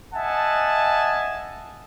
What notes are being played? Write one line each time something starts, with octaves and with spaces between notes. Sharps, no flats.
D#5 E5 F#5 G#5 A5